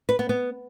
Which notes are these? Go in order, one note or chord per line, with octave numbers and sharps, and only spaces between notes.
B4
B3
B3